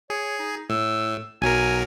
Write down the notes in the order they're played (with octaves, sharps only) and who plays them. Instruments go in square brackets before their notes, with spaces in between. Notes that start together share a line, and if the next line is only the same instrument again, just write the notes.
[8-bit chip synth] G#4 [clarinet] C#5
[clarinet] D#4
[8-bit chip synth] A2 [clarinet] E6
[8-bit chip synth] B1 F#3 A#4 [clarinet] G#5